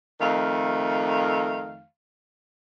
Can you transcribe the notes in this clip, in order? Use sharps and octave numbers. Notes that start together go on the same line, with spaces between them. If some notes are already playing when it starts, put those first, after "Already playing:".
F2 D#3 A3 F5